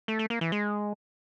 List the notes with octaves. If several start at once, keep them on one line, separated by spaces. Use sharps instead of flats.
A3
A3
A#3
E3
G#3